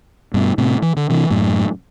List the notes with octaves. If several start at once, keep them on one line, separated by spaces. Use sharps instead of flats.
G2 B2
A2 C3
E3
D3
C3 E3
F#2 A2